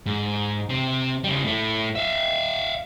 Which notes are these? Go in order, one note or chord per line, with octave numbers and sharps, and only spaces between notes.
G#2
C3 C4
C#3 G3
A2 A3
E5 F5